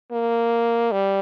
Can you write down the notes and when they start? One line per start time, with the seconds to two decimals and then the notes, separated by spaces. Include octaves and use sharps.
0.12 A#3
0.91 G3